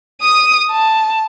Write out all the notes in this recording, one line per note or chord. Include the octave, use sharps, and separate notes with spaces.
D#6 D#7
A5